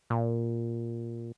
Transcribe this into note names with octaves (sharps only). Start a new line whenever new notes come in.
A#2